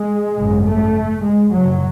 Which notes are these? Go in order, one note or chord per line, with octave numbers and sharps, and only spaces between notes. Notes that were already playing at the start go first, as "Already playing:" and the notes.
Already playing: G#3
G#1 F#2 C#3
A3
G#3
F#1 F#2 C#3 F#3